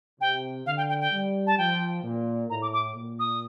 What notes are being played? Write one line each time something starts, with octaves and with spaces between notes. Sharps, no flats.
C3 G5
D3 F5
G5
G5
G5
G3
A5
F3 G5
A#2
A2 A#5
D6
D6
A#2
D#6